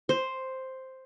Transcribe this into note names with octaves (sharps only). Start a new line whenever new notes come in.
C5